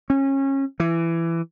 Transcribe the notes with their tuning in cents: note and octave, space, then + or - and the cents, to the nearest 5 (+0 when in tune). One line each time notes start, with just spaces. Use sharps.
C#4 -25
E3 +15